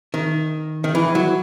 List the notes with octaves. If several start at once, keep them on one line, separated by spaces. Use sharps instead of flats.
D#3
D#3
E3
F#3